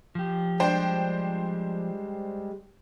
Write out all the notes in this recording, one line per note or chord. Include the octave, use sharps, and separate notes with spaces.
F3 G4
G3 G#3 D4 C5 G5